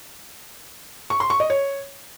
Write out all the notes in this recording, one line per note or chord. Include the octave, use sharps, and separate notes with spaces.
C#6
C6
C#6
D#5
C#5